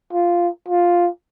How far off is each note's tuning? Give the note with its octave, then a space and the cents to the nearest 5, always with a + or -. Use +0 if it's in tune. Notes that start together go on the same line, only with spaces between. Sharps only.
F4 -5
F4 +5